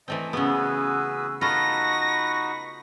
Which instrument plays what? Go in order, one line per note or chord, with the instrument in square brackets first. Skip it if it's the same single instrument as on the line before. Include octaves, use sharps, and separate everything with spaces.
[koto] E3 A3 C4 [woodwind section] D5 D#5 A5
[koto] C#3 B3 [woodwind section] C#4 G#5 E6 [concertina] F#4 G#4 B4
[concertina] D#4 F#4 B4 [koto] F4 A4 [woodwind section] B5 C#6 [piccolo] A#6